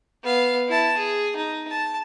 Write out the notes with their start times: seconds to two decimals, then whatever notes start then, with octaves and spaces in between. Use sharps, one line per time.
0.24 B3 F5
0.68 E4 A5
0.98 G#4
1.37 D#4
1.70 A5